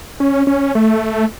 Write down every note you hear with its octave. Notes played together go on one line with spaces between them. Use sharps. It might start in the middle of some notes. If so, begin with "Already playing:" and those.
C#4
C#4
A3